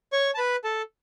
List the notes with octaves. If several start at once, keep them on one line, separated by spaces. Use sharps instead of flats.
C#5 C#6
A5
B4 B5
A4 A5